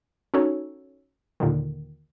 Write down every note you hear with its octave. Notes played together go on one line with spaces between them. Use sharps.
C#4 D#4 F#4 A4 C#5
D#2 A#2 D3 D#3